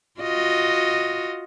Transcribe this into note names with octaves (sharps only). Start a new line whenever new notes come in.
F4 F#4 D#5